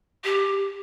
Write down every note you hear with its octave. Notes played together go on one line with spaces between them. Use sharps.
G4